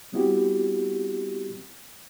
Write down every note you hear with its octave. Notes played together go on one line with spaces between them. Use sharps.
G3 B3 C4 E4 F#4 G4